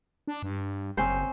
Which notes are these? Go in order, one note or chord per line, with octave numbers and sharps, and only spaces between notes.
D4
G2
F#1 C4 C#4 C5